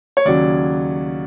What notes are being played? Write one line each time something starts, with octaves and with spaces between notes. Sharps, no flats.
C#5
D#2 C#3 F#3 D5